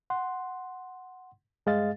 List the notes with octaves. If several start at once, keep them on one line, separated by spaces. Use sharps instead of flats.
F#5 C6
G2 G#3 G#4 D#5 F5 A6